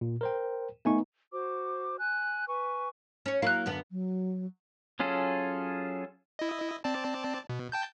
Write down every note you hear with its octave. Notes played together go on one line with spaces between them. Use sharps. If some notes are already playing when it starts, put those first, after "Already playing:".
A#2
A#4 C5 G5
A3 B3 D#4 G#5 C#6
F#4 C5 D6
G#5 F#6
B4 G#5 C#6
C#4 C#5
F#3 A#3 E4 F5 F#6
F#2 D3 B3
F#3
F#3 C#4 F4 G#4 A4
E4 D#5
C4 D5 A5
B2
G5 A5 G6